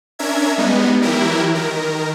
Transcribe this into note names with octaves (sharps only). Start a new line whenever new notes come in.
C#4 D4 A#4 E5 G#6
G3 G#3 B3 D#4
E3 F#3 E4 G4 A#4
D#3 A#4